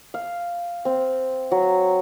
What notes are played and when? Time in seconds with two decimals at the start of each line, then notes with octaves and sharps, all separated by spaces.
0.14 F5
0.85 C4
1.51 F#3